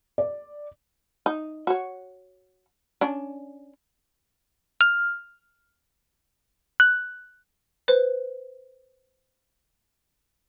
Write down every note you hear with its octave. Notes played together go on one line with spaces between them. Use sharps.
D5
D#4
F#4 C#5
C#4 D4
F6
F#6
B4 C5